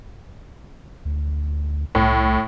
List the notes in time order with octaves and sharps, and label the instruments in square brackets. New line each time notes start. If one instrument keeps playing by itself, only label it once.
[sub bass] D2
[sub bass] C2 [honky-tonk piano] A2